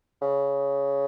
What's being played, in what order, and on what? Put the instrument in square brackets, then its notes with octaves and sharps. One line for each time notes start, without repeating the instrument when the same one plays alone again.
[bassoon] C#3